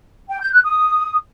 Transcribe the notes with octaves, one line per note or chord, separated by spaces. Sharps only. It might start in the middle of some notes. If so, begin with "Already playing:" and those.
G5
G6
F#6
D#6